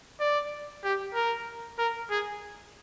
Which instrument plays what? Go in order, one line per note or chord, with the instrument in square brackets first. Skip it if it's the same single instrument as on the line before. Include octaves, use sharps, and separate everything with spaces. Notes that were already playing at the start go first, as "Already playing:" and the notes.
[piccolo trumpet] D5
G4
A#4
A#4
G#4